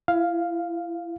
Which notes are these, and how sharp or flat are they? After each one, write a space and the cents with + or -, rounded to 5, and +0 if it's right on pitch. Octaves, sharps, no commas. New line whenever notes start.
E4 +30 F5 +0